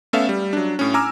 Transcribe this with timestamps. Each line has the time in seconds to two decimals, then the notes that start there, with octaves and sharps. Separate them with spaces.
0.13 A3 B3 C#4 A4 E5 F5
0.29 G3
0.53 F#3 D4
0.79 A2 C#4
0.94 G#5 A#5 D6 E6 F6